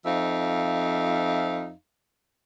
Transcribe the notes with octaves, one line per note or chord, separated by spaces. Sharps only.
F2 F3 D#4 E5 F5